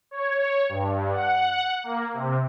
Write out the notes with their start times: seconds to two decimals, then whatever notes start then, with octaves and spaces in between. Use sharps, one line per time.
0.11 C#5
0.69 G2
1.13 F#5
1.84 A#3
2.13 C3